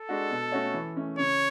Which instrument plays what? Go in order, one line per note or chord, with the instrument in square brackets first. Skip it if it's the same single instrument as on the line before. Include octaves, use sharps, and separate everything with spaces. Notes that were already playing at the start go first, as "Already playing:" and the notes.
Already playing: [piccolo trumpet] A4
[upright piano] G#3 D4 F#4
B2
A3 C#4 F#4 C#5
E3
A3 C#4
[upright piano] C#3 [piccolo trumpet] C#5